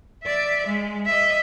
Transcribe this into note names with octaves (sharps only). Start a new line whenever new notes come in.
D5 E5
G#3
D#5 E5